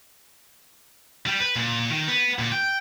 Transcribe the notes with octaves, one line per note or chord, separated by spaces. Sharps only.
G3
B4
A#2
D#3
B3
A#2
G5